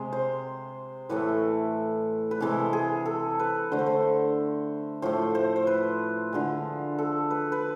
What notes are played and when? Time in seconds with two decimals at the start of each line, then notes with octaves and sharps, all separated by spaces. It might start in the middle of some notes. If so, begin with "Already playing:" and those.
Already playing: C3 G#3
0.13 C5
1.09 A2 E3 A3 B4
2.31 B4
2.40 C3 E3 G#3 A4
2.73 G#4
3.06 A4
3.39 B4
3.72 D3 A3 C5
3.79 B4
3.86 C5
5.02 A2 F3 A3 C5
5.35 C5
5.56 C5
5.67 B4
6.33 D3 F3 G#3
6.98 A4
7.31 B4
7.52 B4